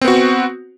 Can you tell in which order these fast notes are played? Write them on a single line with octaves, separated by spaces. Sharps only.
C4 B3 F#4